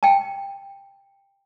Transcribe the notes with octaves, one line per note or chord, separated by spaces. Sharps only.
G5 A5